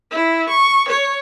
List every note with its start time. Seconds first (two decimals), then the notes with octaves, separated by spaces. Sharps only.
0.11 E4
0.49 C#6
0.88 C#5